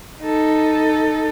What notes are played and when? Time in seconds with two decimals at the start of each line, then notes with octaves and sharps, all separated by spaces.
0.22 D#4 A4